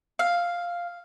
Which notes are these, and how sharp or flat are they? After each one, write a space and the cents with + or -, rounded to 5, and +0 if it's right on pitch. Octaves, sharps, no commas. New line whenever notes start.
F5 +0